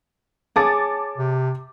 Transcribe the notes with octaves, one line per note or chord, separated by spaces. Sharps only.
G#4 C#5 A5 D6 A6
C3